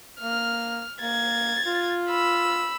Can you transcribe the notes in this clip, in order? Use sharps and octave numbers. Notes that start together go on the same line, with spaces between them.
A#3 F6
A#3 G#6 A6
F4
B5 E6